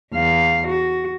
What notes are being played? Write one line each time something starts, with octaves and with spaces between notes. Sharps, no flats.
E2 F5
F#4